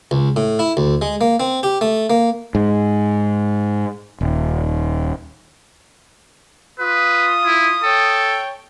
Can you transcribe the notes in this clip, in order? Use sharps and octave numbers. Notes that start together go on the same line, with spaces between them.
C#2
A2
E4
D2
G#3
A#3
C4
G4
A3
A#3
G#2
D#1
F4 B4 D#6
E4
A4 C#5 G5